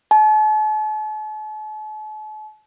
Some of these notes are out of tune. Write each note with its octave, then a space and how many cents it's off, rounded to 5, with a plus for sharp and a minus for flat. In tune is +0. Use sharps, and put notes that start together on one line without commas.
A5 -45